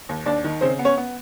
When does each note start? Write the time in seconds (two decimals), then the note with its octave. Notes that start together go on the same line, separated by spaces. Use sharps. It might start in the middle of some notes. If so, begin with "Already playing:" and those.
0.09 D#2
0.26 D#2 D4 D5
0.44 D#3
0.61 C#3 C4 C5
0.79 B3
0.85 C#4 C#5
0.98 B3